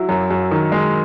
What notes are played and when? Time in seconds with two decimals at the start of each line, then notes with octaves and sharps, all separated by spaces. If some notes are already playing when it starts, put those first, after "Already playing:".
Already playing: F#3 E4
0.09 F#2
0.31 F#2
0.51 D#3
0.72 G#3